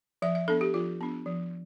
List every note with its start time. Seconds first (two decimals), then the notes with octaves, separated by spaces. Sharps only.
0.22 F3 E5
0.35 E5
0.48 B3 D4 A4
0.61 G4
0.74 F3 F4
1.01 B3 D4
1.26 F3